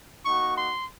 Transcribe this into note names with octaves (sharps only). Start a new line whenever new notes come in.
A#3 D#4 F#4 C#6
C6